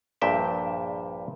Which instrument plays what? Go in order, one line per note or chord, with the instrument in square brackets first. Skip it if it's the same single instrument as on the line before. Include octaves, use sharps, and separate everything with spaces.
[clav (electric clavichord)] A#1 G2 A#2 E5 G5